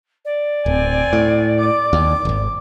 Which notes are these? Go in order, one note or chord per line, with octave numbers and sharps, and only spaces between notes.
D5
D1 C4 G#5
A2
D6
D#2
D1 G#1